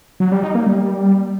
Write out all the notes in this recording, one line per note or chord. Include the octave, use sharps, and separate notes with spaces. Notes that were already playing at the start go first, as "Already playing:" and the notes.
F#3
G3
D#4
A#3
G3